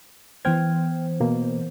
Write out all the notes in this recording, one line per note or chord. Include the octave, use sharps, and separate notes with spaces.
E3 B3 C5 G5 F6 G#6
B2 A#3